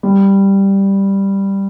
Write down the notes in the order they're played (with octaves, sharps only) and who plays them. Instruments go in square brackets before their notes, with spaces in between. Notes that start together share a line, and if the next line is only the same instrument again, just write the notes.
[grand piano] G3